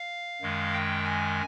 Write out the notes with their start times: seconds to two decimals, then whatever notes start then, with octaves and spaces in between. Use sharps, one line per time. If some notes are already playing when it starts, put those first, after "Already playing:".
Already playing: F5
0.42 F#2 D#3 G#3
0.74 G5
1.05 G#5